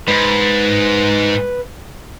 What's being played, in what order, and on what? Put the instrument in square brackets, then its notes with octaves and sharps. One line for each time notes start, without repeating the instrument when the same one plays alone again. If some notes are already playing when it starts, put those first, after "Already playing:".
[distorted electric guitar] G#2 [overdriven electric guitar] B4